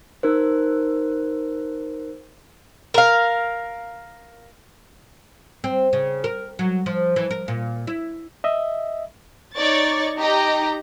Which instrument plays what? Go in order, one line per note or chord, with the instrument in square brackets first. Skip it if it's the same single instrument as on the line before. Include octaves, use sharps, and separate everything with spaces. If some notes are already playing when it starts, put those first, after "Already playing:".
[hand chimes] D#4 A#4 C5
[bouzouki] A#4 F5
[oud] C4
C#3
A#4
F#3
F3
E3
A#4
A#2
E4
[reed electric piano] D#5 E5
[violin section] D#4 C#5 D5 C#6 A6
D#4 G4 D#5 A#5